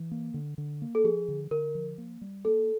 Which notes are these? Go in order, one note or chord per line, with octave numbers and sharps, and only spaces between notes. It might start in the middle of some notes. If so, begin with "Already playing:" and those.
Already playing: E3
A#3
D3
D3
A#3
A4
F3 G#4
D3
D3 A#4
F3
A#3
G3
A#3 A4